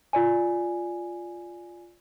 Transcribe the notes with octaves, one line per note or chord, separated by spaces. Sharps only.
F4 D5 G#5